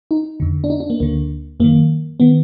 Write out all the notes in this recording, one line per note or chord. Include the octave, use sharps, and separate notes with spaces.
D#4
F2 D3
D4
D#4
D4
A#3
D2 D3 A#3
F#2 D#3 A#3
D#3 B3